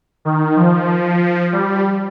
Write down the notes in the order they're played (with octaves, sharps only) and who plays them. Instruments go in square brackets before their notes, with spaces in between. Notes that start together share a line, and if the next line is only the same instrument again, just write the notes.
[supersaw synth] D#3
F3
G3